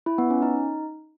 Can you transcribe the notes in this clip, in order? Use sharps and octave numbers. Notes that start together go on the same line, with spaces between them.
E4
B3
C#4
D#4